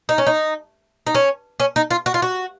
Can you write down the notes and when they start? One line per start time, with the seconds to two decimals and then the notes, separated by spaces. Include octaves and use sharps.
0.09 D#4
0.18 C#4
0.27 D#4
1.07 D#4
1.15 C#4
1.60 C#4
1.76 D#4
1.91 F4
2.06 F#4
2.14 F4
2.22 F#4